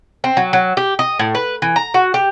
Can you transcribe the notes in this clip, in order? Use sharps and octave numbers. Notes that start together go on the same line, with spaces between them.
C4
F#3
F#3
G4
D#5
A2
B4
E3
A#5
F#4
G4